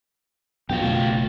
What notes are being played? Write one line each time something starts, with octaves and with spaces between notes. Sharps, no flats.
F#2 B2 D3 F4 G4
F#1 B2 A3